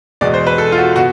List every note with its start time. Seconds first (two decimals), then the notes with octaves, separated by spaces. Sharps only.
0.21 E2 B2 G#3 D5
0.34 C5
0.47 B4
0.58 A4
0.72 F4
0.78 F#4
0.96 B2 F#4